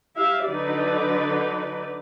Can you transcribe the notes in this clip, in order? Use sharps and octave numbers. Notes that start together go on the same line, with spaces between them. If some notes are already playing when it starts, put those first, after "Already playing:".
E4 G4 E5 F5
D3 F#3 D#4 B4 D5